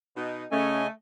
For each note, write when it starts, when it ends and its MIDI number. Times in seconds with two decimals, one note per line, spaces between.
0.17 0.45 47
0.17 0.45 63
0.51 0.87 49
0.51 0.90 57
0.51 0.83 61
0.51 0.87 75
0.51 0.87 80